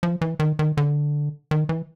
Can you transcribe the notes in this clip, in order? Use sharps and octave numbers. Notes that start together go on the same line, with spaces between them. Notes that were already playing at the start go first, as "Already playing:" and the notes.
F3
E3
D#3
D#3
D3
D#3
E3